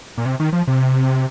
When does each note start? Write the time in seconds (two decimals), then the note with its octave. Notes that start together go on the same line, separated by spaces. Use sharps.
0.18 A#2
0.26 C3
0.40 D#3
0.53 F3
0.67 C3